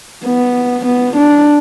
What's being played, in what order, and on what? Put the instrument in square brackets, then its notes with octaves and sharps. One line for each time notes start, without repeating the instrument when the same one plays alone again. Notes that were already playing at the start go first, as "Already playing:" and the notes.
[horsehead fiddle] B3
B3
D4